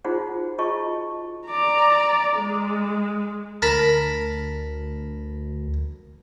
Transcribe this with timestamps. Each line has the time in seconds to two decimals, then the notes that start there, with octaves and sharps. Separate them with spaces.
0.05 D#4 F4 F#4 G#4 C5 F#5
0.58 F4 F#4 G#4 D#5 A5 C#6
1.47 D5 A#5
2.37 G#3
3.62 D2 A#4 A5 B5